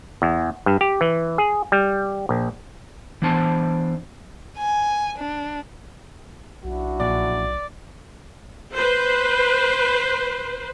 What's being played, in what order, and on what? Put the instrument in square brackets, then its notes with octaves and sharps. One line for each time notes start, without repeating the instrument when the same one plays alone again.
[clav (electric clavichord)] E2
G2
G4
E3
G#4
G3
A#1
[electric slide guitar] E3 B3 D4 C5 A5
[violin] G#5
D4
[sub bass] B1 [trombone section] D4 E4 F#4
[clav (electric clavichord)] A#1 [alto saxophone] D5
[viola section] B4 C5